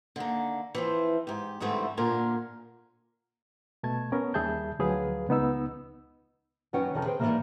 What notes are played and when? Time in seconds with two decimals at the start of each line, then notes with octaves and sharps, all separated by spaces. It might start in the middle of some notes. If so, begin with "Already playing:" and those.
0.16 D3 D#3 A#3
0.75 E3 F3 C4
1.27 G#2 G4
1.60 G#2 D3 E3 G3 A3 C4
1.97 A#2 D3 A#3 A#4 C5 G#5
3.83 B2 A3 A5 G#6
4.12 B3 C#4 A#4
4.34 D#2 G3 G#4 E5 A5 G6
4.79 D2 F3 F#3 G#4 B4 F5
5.29 C#2 B3 D#4 E6
6.73 F#2 D#3 C#4 B4 F#5 G5
6.94 F2 C3 D#3 E3 A4
7.05 G#4 B4 C5 G5
7.19 G#2 C3 D#3 E3 G3 A#3